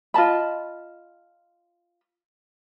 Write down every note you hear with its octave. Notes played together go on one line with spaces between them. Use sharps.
F4 D#5 A5 B5